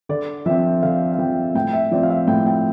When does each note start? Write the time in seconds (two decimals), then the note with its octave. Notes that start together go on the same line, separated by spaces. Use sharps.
0.09 D3 D5
0.46 F3 C4 E5
0.83 D3 F5
1.12 F5
1.18 F3 C4 G5
1.55 A2 G5
1.73 E5
1.92 F3 C4 D5
2.03 F5
2.10 E5
2.28 A2 G5
2.46 G5